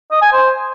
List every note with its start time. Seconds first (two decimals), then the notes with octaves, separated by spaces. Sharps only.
0.11 D#5
0.22 G#5
0.33 C5